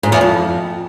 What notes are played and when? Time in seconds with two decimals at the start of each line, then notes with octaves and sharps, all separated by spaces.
0.03 G#2
0.12 E2
0.21 F2